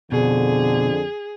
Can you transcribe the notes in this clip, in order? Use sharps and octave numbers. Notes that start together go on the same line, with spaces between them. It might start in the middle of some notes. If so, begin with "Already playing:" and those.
F2 B2 D3 G#4